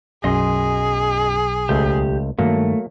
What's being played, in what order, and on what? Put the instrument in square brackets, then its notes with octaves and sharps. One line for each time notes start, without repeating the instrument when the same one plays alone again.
[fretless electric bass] B1 [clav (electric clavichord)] F#2 [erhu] G#4 [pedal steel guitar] D#5 C6
[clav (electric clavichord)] C#2 A3 [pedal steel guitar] G4
[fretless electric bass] G2 D#3 [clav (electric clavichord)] F#3 A#3 [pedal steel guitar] A3